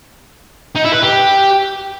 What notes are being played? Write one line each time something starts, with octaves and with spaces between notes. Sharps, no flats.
D#4
E4
B4
G4